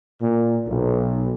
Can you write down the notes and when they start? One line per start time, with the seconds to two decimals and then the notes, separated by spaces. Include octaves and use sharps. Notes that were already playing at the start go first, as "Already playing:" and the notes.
0.21 A#2
0.68 B1